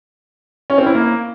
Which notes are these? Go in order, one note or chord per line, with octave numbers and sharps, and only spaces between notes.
C#4
C4
E4
A#3